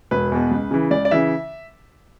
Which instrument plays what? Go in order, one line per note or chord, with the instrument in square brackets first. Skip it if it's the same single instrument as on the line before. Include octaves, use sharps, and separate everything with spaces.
[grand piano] E1 B4
E2 B2
C#2
C#3 E3
C#2 D5
D5
C#3 E3 E5